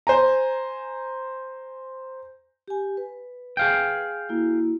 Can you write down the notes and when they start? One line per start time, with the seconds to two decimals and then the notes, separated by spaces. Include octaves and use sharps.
0.07 C5 G#5 A#5
2.68 G4 G#5
2.97 B4
3.57 G#4 F5 G5
4.29 A#3 E4 F#4